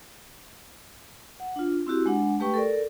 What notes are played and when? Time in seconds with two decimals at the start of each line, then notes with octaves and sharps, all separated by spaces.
1.40 F#5
1.56 D4 F4
1.87 C4 E4 F#4 G4
2.06 G#3 D4 F#5
2.40 A3 G4 B4 G5 C#6
2.54 A4 A#4 D5